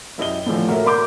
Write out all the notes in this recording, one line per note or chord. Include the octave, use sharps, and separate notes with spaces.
F#2 E4 G4 D#5 G7
A2 D3 E3 F3
A3 A#3 F#4 A#4 C#5 E5
A#4 D5 B5 C6 D6 G6